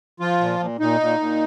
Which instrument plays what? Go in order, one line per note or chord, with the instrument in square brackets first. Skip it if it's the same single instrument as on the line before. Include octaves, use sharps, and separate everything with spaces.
[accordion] F3 F4
A#2
A#2
A#2 D#4
A#2
A#2